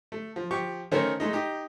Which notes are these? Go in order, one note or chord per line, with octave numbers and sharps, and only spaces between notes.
A3
F3
F3 G4 C#6
D#3 A3 C#4 A4 A#4 C5
G#3 A3 D#4
D#4 G4